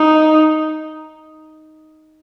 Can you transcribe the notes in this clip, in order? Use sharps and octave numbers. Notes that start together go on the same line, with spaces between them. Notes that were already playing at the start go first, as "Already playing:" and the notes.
Already playing: D#4